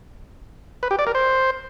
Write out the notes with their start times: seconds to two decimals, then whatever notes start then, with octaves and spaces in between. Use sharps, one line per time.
0.83 B4
0.91 G4
0.99 D5
1.07 A#4
1.15 C5